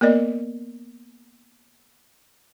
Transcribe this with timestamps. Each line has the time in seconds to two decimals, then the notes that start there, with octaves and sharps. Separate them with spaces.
0.01 A#3 B3 A#4 D5 D#5